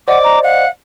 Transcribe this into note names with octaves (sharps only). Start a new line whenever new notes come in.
C5 D5 D#5 F#5 D6
A#5
F5 F#5